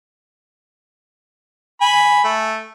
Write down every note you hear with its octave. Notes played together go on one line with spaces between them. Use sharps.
G#5 B5
A3